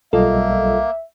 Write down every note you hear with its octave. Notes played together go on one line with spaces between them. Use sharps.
B1 G3 A#3 F4 A4 D#5 E5